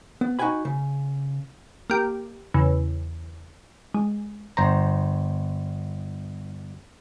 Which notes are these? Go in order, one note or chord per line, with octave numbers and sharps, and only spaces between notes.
B3
D#4 F#4 G4 G5 G#5 B5
C#3
A#3 G4
E2 C#3
G#3
G1 C5 A#5